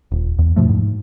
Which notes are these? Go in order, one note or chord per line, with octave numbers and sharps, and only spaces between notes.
D#1
E2
G2 B2 F3 A3
G#2